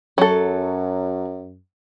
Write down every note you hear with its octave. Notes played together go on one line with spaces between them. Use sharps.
F#2 F#3 A4